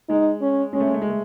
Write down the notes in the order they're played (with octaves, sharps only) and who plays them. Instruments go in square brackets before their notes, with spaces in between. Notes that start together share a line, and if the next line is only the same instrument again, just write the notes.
[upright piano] G#3 [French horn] D#4
[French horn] C#4
[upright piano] G#3 [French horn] C#4
[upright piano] A3
G#3
A3
G#3
A3